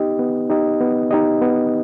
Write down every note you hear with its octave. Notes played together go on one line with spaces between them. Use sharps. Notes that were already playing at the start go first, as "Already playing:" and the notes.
Already playing: B3 D#4 G4 D#5
B3
D#4 G4 D#5
B3
D#4 G4 D#5
B3